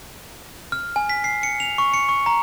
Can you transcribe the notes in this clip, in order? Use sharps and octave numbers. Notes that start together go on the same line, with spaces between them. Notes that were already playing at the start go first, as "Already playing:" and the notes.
F6
G#5
B6
C7
C#7
F7
C#6
C#7
C#6
A#5